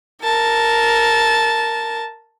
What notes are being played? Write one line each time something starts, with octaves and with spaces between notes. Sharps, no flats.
A#4 A5